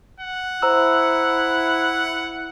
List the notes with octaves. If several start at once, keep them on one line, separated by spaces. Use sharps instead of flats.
F#5
E4 C5 A#5 E6